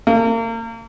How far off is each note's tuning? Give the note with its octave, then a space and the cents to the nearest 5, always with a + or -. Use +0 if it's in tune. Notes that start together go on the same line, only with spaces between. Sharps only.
A#3 -35